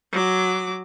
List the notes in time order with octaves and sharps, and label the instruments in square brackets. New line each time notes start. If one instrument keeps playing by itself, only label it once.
[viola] F#3 D6